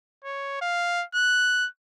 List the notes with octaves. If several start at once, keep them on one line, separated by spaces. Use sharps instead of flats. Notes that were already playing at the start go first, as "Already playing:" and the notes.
C#5
F5
F#6